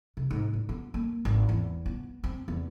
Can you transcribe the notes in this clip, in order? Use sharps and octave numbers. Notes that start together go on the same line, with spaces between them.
C3
G#2
A#2
B3
A#3
G#1
E2
B3
C4
E2